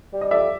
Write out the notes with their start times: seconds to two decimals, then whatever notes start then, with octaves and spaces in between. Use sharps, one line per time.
0.12 G3
0.21 D#5
0.31 F2 D5 E5